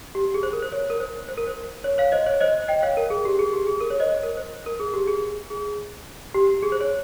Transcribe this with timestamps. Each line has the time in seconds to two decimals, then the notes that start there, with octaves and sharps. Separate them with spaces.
0.15 G4
0.25 G4
0.34 G#4
0.43 C5
0.53 A#4
0.63 C5
0.72 C#5
0.90 A#4
1.00 C5
1.29 C5
1.38 A#4
1.47 C5
1.84 C#5
1.98 C#5 F5
2.12 C5 D#5
2.26 C#5
2.41 C5 D#5
2.68 D#5 G5
2.82 C#5 F5
2.97 A#4
3.10 G#4
3.25 G4
3.39 G#4
3.53 G4
3.67 G#4
3.81 A#4
3.90 C#5
4.00 C5 D#5
4.10 C#5
4.23 A#4
4.37 C5
4.66 A#4
4.80 G#4
4.94 G4
5.08 G#4
5.50 G#4
6.34 G4
6.62 G#4
6.72 C5
6.81 C#5